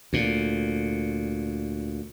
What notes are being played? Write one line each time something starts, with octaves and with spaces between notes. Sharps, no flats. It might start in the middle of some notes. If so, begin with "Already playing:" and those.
D2 A#2